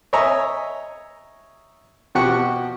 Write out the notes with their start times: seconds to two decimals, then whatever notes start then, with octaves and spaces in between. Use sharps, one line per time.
0.13 C#5 D#5 E5 G#5 A#5
2.15 B2 F3 F#4 G4 F#5 C#6